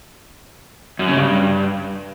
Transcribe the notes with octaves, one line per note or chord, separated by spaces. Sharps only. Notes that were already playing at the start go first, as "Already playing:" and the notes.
F#2
C#3
G2